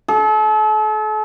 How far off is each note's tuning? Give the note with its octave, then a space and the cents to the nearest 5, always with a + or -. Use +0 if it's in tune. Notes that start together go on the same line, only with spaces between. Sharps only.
A4 -40